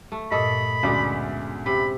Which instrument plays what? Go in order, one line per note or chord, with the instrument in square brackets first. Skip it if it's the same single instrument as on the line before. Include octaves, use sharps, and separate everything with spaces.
[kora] A3
[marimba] G2 A#2 [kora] A4 [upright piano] D#5 [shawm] B5
[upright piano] D2 D4 D6 [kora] B2 G#3 [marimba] C#4
[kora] C3 [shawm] B5